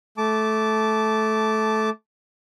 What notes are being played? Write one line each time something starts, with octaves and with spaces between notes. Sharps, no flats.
A3 A5 D6